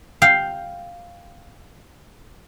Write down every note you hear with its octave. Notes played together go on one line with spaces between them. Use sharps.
F5 G5